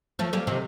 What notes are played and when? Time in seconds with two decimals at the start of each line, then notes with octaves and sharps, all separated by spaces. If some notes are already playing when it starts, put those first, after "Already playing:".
0.19 F3 A3
0.33 G3 A#3
0.47 C3 D#3